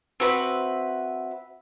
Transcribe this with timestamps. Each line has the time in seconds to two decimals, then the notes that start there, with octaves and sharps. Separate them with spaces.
0.20 C4 F#4 B4 E5